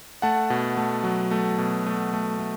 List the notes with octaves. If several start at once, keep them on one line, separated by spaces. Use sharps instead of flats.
A3 F#5 A5
B2
A3
F#3
A3
B2
A3
A3
A3